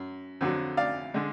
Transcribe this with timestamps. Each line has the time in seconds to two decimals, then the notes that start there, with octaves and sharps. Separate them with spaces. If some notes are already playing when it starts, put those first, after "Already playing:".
Already playing: F#2
0.41 F2 D3 F#3
0.77 D5 F5
1.14 D3 G#3